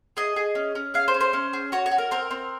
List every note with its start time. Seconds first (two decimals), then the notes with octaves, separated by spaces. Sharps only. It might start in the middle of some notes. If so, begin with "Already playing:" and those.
0.17 G#4 D#5
0.36 G#4
0.55 C#4
0.75 C#4
0.94 G#4 F5
1.08 C5
1.14 C#4
1.21 C5
1.33 C#4
1.53 G#4
1.72 F#4 C#5
1.86 C#5
1.91 F#4
1.98 A#4
2.11 C4 A#4
2.31 C4